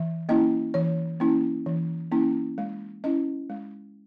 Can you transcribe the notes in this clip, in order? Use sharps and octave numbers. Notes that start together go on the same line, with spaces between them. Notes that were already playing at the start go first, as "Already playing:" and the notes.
Already playing: E3 E5
A#3 C#4 E4 D#5
E3 C#5
A#3 C#4 E4
E3
A#3 C#4 E4
G#3
C#4 E4 D#5
G#3